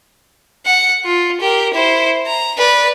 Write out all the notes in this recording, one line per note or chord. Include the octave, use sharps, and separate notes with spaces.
F#5
F4
G4 A#4
E4 C5
A#5
B4 D5